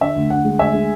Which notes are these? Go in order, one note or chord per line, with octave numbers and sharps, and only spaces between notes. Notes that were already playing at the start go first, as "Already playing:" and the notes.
D3 E5
D2
D2 F#5
G#3
D2 E5 G#5
G#3